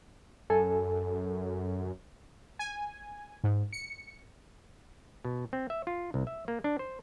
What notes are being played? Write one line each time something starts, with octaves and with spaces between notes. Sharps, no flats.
F#2 A4 G#5
G#5
G#2
C#7
B2
C4
E5
F4
C2
E5
A#3
D4
C5